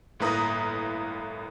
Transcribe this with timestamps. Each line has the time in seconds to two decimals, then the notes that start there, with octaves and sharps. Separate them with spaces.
0.20 G1 A2 A#3 B4 A#5 D#6